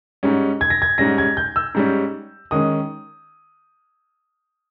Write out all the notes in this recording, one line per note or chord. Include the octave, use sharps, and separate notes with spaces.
G#2 G3 C#4
G#6
A#6
G#6
G#2 G3 C#4 A#6
G#6
G6
E6
G#2 G3 C#4
D#3 G#3 C#4 D#6